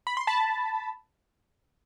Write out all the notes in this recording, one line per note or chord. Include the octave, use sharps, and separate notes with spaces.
B5
C6
A5 B5